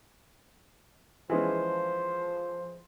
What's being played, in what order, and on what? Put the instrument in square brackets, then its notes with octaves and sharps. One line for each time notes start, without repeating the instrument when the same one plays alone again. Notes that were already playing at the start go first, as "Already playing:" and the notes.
[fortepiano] E3 G#3 C#4 [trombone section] F3 C5